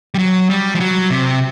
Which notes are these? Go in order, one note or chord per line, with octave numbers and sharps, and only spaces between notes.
G3
F#3
G3
F3
F#3
C3